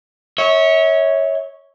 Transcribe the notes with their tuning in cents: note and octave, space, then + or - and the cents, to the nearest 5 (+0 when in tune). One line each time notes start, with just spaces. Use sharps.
C#5 +0 E5 -35